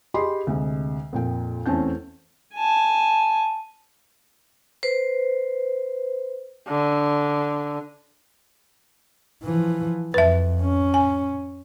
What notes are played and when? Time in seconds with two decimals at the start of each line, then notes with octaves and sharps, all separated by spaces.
0.14 G4 G#4 D#5 B5 C6
0.47 D2 C3 G#3
1.13 F2 A#2 G5
1.66 E2 A3 C4 C#4 A5 G6
2.55 G#5 A5
4.83 B4 C5
6.68 D3
9.43 E3 F3
10.14 F2 B4 E5
10.61 C#4
10.94 G#5